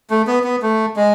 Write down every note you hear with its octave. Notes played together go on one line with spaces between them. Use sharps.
A3
B3
B3
A3
G#3